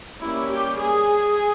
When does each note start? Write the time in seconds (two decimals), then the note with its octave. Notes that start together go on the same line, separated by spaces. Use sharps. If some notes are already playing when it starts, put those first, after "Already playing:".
0.20 G3 A#3 C#4 E4
0.50 G4
0.79 G#4